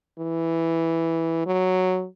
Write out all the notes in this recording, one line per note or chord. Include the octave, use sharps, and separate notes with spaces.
E3
F#3